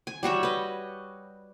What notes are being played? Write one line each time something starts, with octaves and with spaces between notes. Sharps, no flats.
G#5
G3 F#4 C#5 E5
B4 D#5